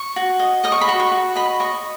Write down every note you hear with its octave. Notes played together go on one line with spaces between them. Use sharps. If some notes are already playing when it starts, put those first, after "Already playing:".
Already playing: C#6
F#4
D#5
D#5 D#6
C#6
B5
F#4 C#6
C#6
F#4
D#5 B5
D#5 C#6